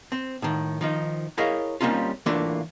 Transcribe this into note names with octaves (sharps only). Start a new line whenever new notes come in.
C4
A2 D#3
D#3 F3 D#4
E4 G#4 A#4 C#5 D#5 F5
G3 A#3 C4 C#4 D#4 F4
E3 A3 A#3 D4 F4